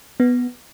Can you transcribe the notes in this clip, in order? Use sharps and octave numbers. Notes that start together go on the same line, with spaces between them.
B3